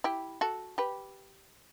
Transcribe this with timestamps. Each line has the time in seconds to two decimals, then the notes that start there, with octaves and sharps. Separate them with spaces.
0.04 E4 G4
0.41 F#4 A4
0.78 G4 B4